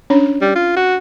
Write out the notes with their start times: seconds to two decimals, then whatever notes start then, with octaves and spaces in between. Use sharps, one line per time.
0.10 C#4 D4 C#5
0.41 G3
0.55 F4
0.76 F#4